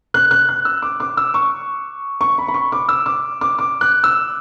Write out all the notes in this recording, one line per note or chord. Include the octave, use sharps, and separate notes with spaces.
F#6
F#6
F#6
E6
D6
D6
E6
C#6
C#6
B5
B5
C#6
D6
E6
D6
D6
D6
F#6
E6